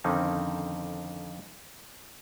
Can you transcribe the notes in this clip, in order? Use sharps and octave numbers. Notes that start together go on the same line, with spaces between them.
F2 D3 D#3 C4 C#4 D#4